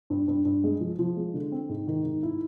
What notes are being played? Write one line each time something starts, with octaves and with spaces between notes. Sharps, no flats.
G2
G2
G2
G#3
F3
F3
G#3
D3
C4
G#2
D#3
G#2
E4